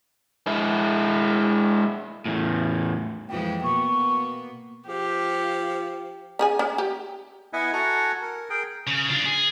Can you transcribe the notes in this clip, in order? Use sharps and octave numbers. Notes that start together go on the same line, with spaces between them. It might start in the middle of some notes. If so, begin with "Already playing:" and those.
G#3 E4
E2 A2
F2 E3 G#3 G5
B2 A#3 B3 C#6
F3 G4
C#4 G#4 G#5
C#4
G4
B3 E4 D#5 E5 F#5 G#5
F#4 A4 F#5 G#5 A#5
A#4
G#4 A#4 G5
C#3
D4 F4
G#4